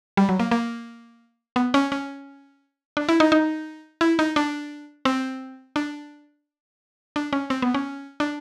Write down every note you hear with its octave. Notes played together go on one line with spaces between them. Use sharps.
G3
F#3
A#3
A#3
B3
C#4
C#4
D4
E4
D#4
D#4
E4
D#4
D4
C4
D4
D4
C#4
C4
B3
C#4
D4